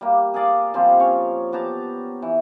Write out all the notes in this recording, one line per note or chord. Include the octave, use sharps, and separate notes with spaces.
G3 A#3
G#4 A#4 D5 F5
F3 G3 C4
C#4 C#5
B3 G4 A5 A#5
E3